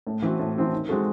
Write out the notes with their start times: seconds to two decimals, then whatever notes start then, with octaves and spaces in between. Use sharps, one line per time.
0.07 A2
0.22 E3 C4 F#4
0.39 A2
0.56 E3 C4 F#4
0.72 D#3
0.88 G#3 C4 F#4 A4